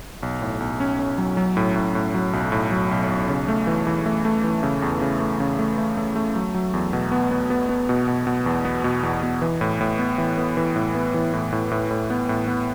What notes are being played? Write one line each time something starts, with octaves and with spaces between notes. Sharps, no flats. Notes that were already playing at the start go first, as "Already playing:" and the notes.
B1
A2
B1
C#4
C#4
F#3
F#3
A2
A2
A2
F#3
B1
A2
F#3
B1
B1
C#3
A3
E3
E3
A3
A3
E3
C#3
E2
C#3
A3
C#3
A3
A3
A3
A3
F#3
F#3
E2
B2
B3
B3
B3
B3
B2
B2
B2
E2
B3
B2
E2
B2
E3
A2
A2
B3
E3
B3
E3
A2
B3
E3
A2
A2
A2
A2
B3
A2
B3